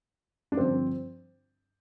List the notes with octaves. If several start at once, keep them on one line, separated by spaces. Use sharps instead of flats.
D4
G2 D3 F3 C4